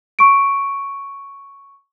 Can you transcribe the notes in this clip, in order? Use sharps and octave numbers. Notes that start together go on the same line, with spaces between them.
C#6 D7